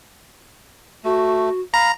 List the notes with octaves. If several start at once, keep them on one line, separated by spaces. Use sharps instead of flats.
A3 F#4
F5 A#5 B5